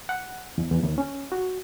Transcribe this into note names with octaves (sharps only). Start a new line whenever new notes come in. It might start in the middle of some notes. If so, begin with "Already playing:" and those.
F#5
E2
E2
D#2
C#4
F#4